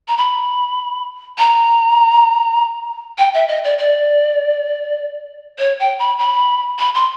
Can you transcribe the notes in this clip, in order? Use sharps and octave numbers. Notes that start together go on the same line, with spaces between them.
A#5
B5
A#5
G5
E5
D#5
D5
D5
C#5
G5
B5
B5
B5
C6